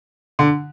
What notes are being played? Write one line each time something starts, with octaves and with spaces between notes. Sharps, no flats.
D3